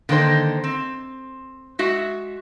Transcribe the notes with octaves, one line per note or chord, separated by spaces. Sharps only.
D3 D#3 A#3 D#4 C5
C4
G#3 F#4 E5